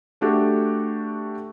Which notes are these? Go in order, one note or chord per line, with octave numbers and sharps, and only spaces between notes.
A3 D4 F#4 G4 A4